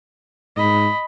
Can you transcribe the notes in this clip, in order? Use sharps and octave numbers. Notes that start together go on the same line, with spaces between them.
G#2 D#5 B5